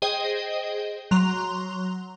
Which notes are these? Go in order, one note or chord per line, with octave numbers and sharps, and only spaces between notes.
G#4 C5 D#5 G5
F#3 A#5 C6 F7